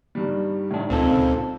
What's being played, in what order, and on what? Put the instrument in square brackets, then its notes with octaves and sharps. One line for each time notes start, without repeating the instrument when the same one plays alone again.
[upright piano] G2 D#3 G3
[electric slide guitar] A2 D4 [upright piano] D#3
[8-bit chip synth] C#2 A#2 [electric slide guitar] C4 A4